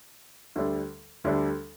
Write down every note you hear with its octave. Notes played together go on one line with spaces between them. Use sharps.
D2 D3 G3 D4 A4
D2 D3 G3 D4 A4